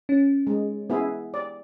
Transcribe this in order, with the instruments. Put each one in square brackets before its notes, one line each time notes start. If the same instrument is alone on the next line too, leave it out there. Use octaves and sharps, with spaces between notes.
[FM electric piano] C#4
[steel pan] G#3
B3 E4 G#4
D5